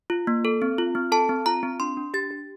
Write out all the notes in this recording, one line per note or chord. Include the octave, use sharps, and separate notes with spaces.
F4
A#3
A4
C4
F4
C4
A4 A5
C4
F4 A#5
C4
D4 C6
D4
G4 A6
G4